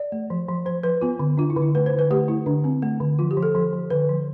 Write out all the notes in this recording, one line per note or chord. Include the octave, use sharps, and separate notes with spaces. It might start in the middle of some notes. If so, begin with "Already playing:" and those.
Already playing: D5
A3
F3
F3
F3 C5
F3 B4
B3 F4
D3
D4 F4
E4
D3
E4
A3 B4
C5
D3
B4
A3 G4
A3 E4
D3 D4
C4
A3
D3
F3 F4
G4
F3
A4
F3
F3
D3 B4
F3